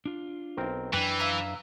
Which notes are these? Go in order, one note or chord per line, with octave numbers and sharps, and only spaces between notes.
D4 F4
B1 C4 A#4
F#2 E3 D4 B4 G5
E5 F5 A#5